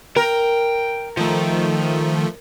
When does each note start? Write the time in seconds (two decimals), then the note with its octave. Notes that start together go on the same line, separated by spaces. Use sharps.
0.16 A#4 G5
1.17 D#3 F3 A3